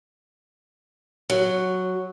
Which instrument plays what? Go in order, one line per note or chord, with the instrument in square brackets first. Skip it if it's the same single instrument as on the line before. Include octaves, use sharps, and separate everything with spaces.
[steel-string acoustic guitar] F#3